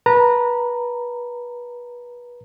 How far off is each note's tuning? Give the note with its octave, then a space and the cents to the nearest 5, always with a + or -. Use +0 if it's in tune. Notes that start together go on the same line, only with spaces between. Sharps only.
B4 -25 A#5 -20